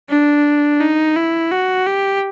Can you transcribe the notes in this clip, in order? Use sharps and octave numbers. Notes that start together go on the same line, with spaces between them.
D4
D#4
E4
F#4
G4